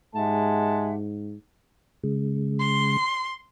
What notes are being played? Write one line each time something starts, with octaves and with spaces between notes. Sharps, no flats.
G#2 G#3 G4 E5 F#5 A5
C#3 G#3
C6